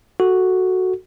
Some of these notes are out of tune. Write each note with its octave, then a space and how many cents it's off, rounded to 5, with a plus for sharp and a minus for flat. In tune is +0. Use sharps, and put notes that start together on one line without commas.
F#4 +0 A4 +0